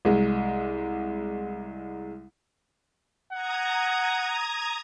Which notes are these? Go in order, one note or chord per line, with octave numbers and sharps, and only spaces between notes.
C2 G#3
F#5 A#5 D#6 G#6